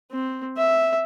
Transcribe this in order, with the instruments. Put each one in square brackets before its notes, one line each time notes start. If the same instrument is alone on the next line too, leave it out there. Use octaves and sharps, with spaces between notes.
[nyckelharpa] C4
E5